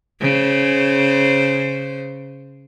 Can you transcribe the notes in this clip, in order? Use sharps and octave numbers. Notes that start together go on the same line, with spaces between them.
C#3 C5